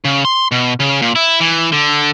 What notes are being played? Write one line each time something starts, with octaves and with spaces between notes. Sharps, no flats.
C#3
C6
B2
C#3
A#2
E4
E3
D3